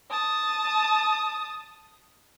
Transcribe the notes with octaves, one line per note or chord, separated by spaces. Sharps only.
A5 D#6